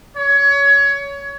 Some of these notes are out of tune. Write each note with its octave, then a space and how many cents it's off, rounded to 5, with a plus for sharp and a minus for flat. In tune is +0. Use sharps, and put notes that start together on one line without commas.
C#5 +20